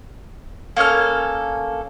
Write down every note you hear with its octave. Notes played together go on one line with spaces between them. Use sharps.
A#3 C#4 A4 F6